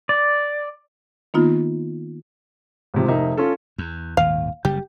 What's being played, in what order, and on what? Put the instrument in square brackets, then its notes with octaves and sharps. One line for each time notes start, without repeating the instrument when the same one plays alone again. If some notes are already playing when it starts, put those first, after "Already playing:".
[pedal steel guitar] D5
[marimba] D#3 A#3 B3 D#4 F4
[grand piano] A1 G#2 C3 F3
F1 D#4 A#4 E5
C#4 F4 A4
[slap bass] E2
[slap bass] D#1 G#1 D#2 [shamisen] F5
[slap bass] F#1 C#3 G3 [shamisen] G4